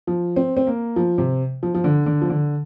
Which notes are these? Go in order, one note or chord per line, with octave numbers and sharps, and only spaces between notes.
F3
C4
C4
A#3
F3
C3
F3
F3
D3
D3
F3
D3